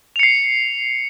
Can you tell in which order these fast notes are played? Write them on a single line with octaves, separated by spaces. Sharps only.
F7 C#7 C7